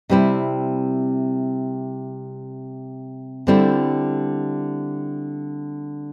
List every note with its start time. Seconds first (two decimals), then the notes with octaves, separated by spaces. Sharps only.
0.10 C3 G3 C4 E4
3.47 D3 G3 C4 E4